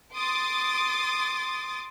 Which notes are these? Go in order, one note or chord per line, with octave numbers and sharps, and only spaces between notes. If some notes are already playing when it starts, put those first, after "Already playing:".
C6 D6 D#6 A6